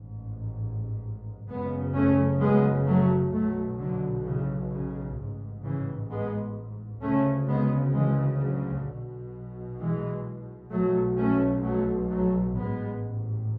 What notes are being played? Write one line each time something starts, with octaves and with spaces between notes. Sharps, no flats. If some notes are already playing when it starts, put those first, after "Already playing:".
Already playing: A1 G#2
F#1 F#2 C#3 G#3 B3
A3 C#4
G#3 B3
F#3 A3
B1 B2 F#3 A3
D3 F#3
C#3 E3
C#3
A1 G#2
C#3 E3
G#3 B3
D2 C#3 A3 C#4
G#3 B3
E3 G#3
D3 F#3
B1 B2
E3 G#3
B1 B2 F#3 A3
A3 C#4
F#3 A3
F#3 A3
A1 G#2 G#3 B3